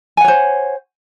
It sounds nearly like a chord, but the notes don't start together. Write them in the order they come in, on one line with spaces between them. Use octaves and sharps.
G#5 F#5 C#5 C5